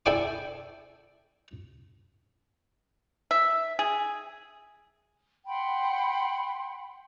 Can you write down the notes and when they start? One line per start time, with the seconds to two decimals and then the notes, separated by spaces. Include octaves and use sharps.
0.06 E4 A4 D5 G5 G#5 D6
3.31 E5
3.79 G#4
5.47 F#5 G5 B5 C6